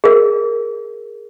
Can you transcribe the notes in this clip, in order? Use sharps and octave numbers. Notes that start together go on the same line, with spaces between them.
G#4 A#4